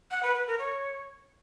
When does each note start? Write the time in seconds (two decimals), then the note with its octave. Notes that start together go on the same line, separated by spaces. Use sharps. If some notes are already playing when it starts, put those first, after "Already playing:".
0.11 F#5
0.23 B4
0.35 B4
0.47 A#4
0.59 C#5